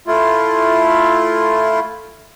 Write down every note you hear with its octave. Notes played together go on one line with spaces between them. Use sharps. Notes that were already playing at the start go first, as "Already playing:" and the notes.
A3 E4 F4